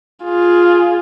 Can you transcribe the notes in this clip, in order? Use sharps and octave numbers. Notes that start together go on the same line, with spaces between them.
F4 G#4